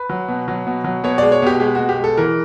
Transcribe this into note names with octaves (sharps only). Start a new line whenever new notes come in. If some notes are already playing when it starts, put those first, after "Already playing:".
Already playing: B4
F#3
B2
F#3
B2
F#3
B2 C#5
G#3 D5
C#5
B2 G4
G#3 G4
B2 F#4
G4
G#3
A4
E3 A#4